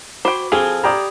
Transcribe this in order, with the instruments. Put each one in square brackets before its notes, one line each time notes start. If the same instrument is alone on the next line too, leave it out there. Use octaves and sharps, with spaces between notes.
[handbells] F#4 B5 D6 [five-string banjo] C5 G5
[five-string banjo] F3 C4 [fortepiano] G#4 [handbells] A4 F6 G#6
[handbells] G4 B5 D#6 [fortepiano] D5 G5 A#5